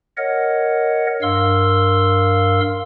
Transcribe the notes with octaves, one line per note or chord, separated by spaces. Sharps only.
A#4 C#5 D#5 F#5
G2 A#4 F5 C6 E6